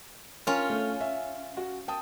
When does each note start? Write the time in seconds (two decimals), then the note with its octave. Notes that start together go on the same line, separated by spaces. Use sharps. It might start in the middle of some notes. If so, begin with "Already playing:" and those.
0.47 C#4 F4 A#4
0.70 A3
1.01 E5
1.57 F#4
1.88 G5 A5 D#6